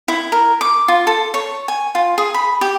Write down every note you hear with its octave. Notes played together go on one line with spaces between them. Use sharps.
E4
A#4
D6
F4
A4
C#5
G#5
F4
G#4
B5
G4